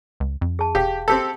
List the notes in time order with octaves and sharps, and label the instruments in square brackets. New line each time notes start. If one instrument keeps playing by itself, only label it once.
[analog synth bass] C#2
F2
[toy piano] G#4 A5
[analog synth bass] E1 [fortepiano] G4 [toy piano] G#4 F5 G5
[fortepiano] C4 G4 A4